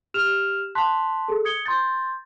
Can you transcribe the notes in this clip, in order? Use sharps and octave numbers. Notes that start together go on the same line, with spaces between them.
G4 F6 E7 F7
A5 C6 F#6 B6
G#4 A4
D#6 G#6 C#7 G7
C6 G6 A6